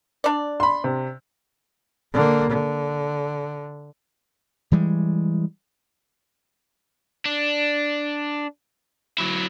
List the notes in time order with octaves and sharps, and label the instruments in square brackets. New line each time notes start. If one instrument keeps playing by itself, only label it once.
[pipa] D4 D5
[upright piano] B5 C6
C3
[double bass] D3 A#3
D3
[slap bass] E3 G3 G#3
[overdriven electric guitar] D4
F#3 E4